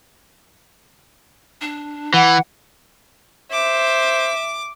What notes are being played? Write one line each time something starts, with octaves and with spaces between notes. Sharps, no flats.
D4
E3 F#5
C5 E5 D6